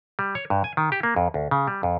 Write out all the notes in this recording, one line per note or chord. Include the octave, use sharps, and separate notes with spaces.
G3
C#5
G2
G#5
D#3
G4
A#3
F2
D2
C#3
G3
F2